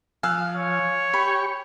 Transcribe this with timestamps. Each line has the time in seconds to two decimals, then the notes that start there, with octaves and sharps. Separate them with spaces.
0.23 F3 F5 G#5 E6 F#6
0.56 C#5
1.14 G4 B5 C#6